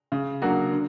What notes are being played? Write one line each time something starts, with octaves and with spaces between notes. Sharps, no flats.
C#3
F#3 A#3 D4 F#4
D3